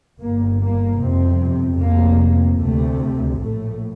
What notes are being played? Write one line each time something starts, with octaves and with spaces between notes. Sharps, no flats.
G1 G2 A#3
A#3
G1 F2 C3 C4
F1 F2 C3 A#3
D2 C3 A3
A#1 A2 A3